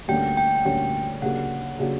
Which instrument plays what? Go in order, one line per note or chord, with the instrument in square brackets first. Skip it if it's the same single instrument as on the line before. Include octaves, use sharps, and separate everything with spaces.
[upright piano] D2 D3 G3 A#3 C#4 [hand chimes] G5
[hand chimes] G5
[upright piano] D2 D3 G3 A#3 C#4 [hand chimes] G5
[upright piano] C#3 F#3 A#3 D4 G4 [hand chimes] F#5
[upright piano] C#3 F#3 A#3 D4 G4